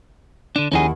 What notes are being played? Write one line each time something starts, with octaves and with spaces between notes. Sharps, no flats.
D3 D4
D#2 C#4 D#4 E4 G#4 F#5